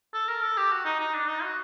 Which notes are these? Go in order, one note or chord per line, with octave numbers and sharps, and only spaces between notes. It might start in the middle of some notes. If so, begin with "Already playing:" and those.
A4
A#4
A4
G4
F#4
D#4
D#4
D4
D#4
F#4